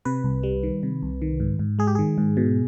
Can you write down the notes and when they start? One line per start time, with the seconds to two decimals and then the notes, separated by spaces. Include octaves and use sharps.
0.05 C3 B4
0.24 C2
0.43 G3
0.63 D#3
0.83 C3
1.03 C2
1.22 D#3
1.40 G#2
1.59 G#2
1.79 G#3 G#4
1.87 G4
1.95 D#3 G#4
2.18 G#2
2.37 B2